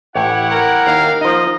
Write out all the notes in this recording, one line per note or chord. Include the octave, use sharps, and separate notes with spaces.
A1 E4 G4 C#5 F#5
A#4
D#2 F5
F3 D#4 D#5